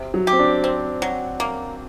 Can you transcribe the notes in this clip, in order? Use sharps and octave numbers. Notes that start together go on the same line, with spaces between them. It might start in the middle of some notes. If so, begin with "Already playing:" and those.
Already playing: C3
F#3
G4
C4
D4
C4
F#3
A#3